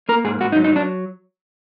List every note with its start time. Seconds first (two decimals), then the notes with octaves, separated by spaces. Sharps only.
0.09 A#3 A#4
0.25 G#2 G#4
0.41 G#2 F#4
0.52 D#4
0.56 F#3
0.64 D#4
0.72 F#3 D4